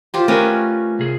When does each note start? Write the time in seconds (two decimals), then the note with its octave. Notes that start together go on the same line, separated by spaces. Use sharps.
0.14 F4 G4 C5
0.28 A3 C#4 A#4 B4 G#5
0.99 C2 G#4